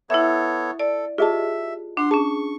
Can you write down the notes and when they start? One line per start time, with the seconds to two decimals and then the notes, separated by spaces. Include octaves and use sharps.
0.10 B3 E4 A4 C#5 E5
0.79 A4 D5
1.18 F4 G4 G#4 D#5 E5 A5
1.97 D4 F#5 C6
2.11 C#4 G#4 A5 C#6